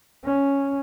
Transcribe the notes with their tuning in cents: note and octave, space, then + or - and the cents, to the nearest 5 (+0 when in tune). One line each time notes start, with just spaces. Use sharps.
C#4 +0